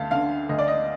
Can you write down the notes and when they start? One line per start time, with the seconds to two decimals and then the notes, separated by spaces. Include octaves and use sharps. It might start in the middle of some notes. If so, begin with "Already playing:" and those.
Already playing: D2 F5 A5
0.11 D3 F5
0.49 D2 D#5
0.58 D5
0.68 D#5